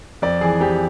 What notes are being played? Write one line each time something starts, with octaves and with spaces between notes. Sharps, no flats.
F2 D5
E3 G#4
F2 G4